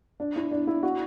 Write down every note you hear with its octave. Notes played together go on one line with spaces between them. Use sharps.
D4
E4
D4
E4
F#4